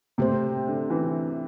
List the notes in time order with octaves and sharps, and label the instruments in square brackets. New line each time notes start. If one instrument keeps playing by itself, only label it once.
[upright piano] C3 [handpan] A3 C4 G4 C5
[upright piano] D3
E3